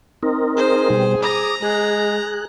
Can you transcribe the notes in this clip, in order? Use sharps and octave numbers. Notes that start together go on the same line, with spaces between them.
C4 D#4 A#4
G#4 C5
B2 G3
A#5 D6 D#6
G#3 G#4 F#6